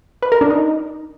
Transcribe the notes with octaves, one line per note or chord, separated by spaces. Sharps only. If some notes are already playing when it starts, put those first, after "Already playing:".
B4
A#4
D4
D#4